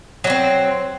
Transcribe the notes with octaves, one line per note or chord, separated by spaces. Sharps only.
F#3 A#3 C4